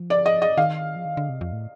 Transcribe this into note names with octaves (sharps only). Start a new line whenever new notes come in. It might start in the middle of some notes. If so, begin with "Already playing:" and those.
Already playing: F3
D5
D#5
D#5
D#3 F5
F3
D#3
D3
C3
F2
A2